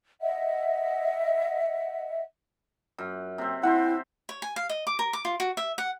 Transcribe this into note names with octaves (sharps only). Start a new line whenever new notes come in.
D#5 E5 F#5
F#2
C3 C4
C3 C4 E4 C5 F#5
C#5
G#5
F5
D#5
D6
A#4
D6
F4
F#4
E5
F#5